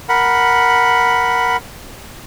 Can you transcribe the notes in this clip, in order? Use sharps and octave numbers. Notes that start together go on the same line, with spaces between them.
A#4 F#5 B5